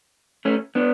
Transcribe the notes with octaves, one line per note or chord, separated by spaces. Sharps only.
A3 C#4
B3 D4